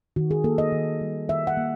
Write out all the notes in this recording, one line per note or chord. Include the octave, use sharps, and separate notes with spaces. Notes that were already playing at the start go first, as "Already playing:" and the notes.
D#3 F#4
G#4
A#3 A4
D#5
D#3
G3
D#3 E5
F#5
A#3